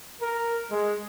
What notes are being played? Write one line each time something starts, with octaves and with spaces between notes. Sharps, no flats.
A#4
G#3